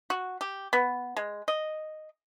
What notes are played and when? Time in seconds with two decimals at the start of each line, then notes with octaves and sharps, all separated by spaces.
0.10 F#4
0.41 G4
0.73 B3
1.16 G#3
1.48 D#5